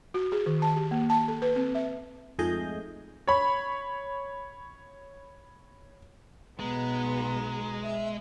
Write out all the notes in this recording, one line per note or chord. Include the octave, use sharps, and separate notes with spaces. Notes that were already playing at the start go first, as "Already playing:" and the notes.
F#4
G#4
D#3
A5
G4
A#3
A5
A4
B4
C4
E5
F2 G#2 A3 G#4 D#5 G6
C#5 B5
B1 G#3 B3 A#5
E5